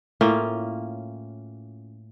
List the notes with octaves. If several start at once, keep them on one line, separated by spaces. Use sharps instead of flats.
A2 A#3 C#4 F4